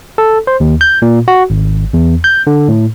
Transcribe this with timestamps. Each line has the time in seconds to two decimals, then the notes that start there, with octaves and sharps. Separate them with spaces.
0.18 A4
0.47 C5
0.60 D#2
0.81 G6
1.02 A#2
1.28 F#4
1.50 G#1
1.94 E2
2.24 G6
2.47 D3
2.69 A2